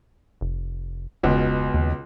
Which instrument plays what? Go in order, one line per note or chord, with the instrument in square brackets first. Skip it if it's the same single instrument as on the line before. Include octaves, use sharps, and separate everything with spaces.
[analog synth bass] F1
[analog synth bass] E1 [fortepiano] C#2 B2
[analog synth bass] D#2